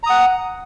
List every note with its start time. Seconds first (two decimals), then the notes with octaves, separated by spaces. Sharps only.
0.03 A#5
0.06 D#6
0.10 F#5